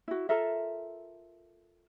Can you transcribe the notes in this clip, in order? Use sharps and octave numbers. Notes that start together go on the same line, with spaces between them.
E4 F#4
F4 A4 A#4 E5